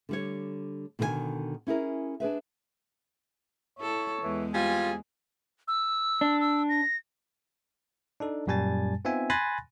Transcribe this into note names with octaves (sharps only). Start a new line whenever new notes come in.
D3 G3 C#5
B2 D3 D#3 C5 G#5
C#4 E4 G#4 A#4
D4 G#4 B4 E5
E4 A4 C#5
E2 E3 G#3
G3 C4 F4 G#4 G#5
E6
D4
E6
A#6
D4 D#4 A4
F#2 A#2 G3 G#5 A5 A6
B3 C4 D#4 F4 E5 G#5
G#5 B5 C6 F#6 A6 A#6